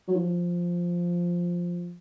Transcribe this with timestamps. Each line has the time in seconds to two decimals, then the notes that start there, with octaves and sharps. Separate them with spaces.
0.08 F#3
0.16 F3